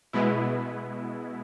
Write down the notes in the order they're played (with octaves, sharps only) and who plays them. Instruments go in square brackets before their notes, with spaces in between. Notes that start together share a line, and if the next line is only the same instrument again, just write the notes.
[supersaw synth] B2 G#3 B3 E4